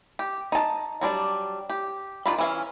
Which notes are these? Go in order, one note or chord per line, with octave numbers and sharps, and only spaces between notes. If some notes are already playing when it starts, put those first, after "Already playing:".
G4
D#4 A5
F#3 G3 D4 D5
G4
D#3 D4 F4 G5 B5
E3 C#4 F5